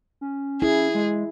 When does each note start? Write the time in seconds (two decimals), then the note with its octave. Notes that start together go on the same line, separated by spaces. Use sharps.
0.21 C#4
0.62 E4 G#4
0.95 G#3